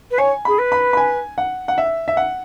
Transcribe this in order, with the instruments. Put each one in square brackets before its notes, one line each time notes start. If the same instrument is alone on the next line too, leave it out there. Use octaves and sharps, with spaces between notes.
[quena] B4
[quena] C#5 [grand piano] G#5
[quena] G#4 [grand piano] B5
[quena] B4
[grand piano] B5
B5
G#5
F#5
F#5
E5
E5
F#5